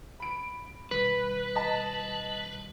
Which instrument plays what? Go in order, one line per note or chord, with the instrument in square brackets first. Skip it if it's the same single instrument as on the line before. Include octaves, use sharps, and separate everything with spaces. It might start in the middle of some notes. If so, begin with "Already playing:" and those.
[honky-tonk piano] B5 D7
[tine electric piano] B2 D#3 G3 [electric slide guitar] B4
[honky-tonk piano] D#5 A5